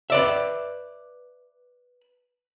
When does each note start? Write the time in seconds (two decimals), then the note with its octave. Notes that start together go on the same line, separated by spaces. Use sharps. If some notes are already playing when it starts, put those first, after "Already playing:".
0.10 B4 D5 E5